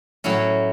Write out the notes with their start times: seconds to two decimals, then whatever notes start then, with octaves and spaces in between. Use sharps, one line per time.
0.24 A2 F#3 C#4 E4